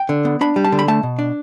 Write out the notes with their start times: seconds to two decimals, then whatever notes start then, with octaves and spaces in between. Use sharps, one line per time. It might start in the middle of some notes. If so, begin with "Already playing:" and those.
Already playing: G5
0.09 D3
0.25 B3
0.41 D4 B5
0.56 G3
0.65 A5
0.72 D3
0.79 B5
0.88 A3 A5
1.03 B2
1.19 D4